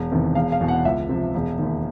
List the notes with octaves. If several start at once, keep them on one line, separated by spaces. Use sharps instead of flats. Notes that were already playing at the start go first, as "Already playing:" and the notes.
Already playing: E1
E2 C3 D#3
E1 F5
F5
E2 B2
F#5
C#2 E5
C3 F3
E1
D#2 D#3